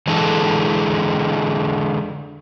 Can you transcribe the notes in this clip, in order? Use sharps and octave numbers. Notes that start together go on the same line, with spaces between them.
D3 E3 G#3 A4